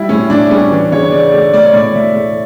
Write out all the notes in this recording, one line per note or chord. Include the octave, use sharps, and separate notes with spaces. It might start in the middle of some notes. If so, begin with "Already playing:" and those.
Already playing: G3 E4
A2 C#4
A2 D4
G3 C#4
E3 D4
C#3 C#5
C#3 D5
A3 D5
A2 D5
C#5
A2 D5
A2 E5
A3